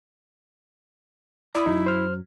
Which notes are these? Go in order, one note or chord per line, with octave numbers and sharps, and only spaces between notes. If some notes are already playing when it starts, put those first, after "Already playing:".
E4 D5 A#5 B5 D#6
F#2 F#3 D#4
C5 F6